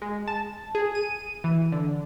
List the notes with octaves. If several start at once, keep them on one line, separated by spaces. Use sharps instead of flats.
G#3
A5
G#4
D#7
E3
D3